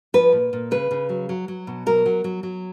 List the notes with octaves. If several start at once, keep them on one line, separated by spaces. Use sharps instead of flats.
F3 B4
A#2
A#2
C#3 B4
C#3
F#3
F#3
F#3
B2
F#3 A#4
F#3
F#3
F#3